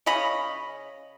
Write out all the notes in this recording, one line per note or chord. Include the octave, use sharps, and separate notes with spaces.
C#3 C#4 D#5 B5